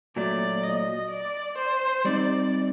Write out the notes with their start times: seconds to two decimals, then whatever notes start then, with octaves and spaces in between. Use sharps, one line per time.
0.16 A#2 F#3 A3 D5
0.63 D#5
1.10 D5
1.58 C5
2.05 G3 C4 D#4 D5